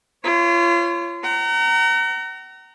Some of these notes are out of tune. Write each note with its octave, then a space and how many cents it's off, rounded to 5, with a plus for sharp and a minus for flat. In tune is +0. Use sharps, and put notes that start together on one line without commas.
F4 -35 C#5 +0
F#5 +40 A#5 -15